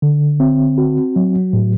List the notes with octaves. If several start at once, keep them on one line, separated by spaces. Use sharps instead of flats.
D3
C4
F#4
F#3
A2